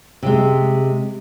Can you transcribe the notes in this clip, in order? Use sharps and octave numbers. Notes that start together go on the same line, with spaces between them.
C3 G#3